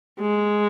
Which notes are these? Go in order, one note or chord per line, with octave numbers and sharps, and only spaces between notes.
G#3